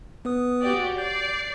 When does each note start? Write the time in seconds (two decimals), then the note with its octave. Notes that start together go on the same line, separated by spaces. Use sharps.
0.25 B3 B4 D#6
0.63 F#4 G4 D5
0.98 D5 G6 C7